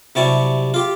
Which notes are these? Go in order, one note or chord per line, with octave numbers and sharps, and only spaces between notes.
C3 F#3 G3 E4 A5 C#6
F4 G4